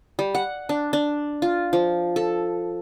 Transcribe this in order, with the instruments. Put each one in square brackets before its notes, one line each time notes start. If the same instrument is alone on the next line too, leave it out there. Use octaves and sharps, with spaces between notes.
[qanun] G3
F#5
D4
D4
F4
F3
A4